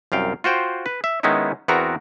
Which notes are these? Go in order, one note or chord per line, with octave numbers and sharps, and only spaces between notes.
C2 F#2 F5 G5
F4 F#4 C5 G5
B4
E5
D#3 G#3 B3 C#4 D#4 E4
E2 B3 C4 F#4 A#4 A#5